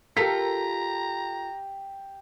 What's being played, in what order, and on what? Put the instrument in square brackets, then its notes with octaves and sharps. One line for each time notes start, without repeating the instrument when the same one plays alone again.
[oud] F4 A4 A#4 [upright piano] G4 B6 [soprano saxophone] A#5